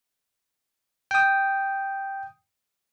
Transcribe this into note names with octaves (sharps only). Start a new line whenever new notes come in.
G5 D#6